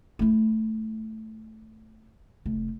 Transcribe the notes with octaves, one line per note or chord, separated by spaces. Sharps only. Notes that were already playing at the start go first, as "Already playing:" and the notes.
A3 E4
F1 A3